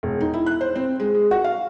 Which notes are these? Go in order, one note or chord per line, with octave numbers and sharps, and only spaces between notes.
E1
D#4
E4
F#6
C5
C4
G#3
G#3
F#4
F5